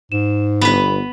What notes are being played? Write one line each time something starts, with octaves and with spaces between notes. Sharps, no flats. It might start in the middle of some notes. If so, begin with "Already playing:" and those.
G#2 E7
G1 B3 B4 B5